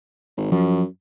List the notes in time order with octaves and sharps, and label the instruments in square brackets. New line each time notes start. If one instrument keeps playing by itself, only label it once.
[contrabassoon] G#1
[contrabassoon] F#2 [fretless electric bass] F3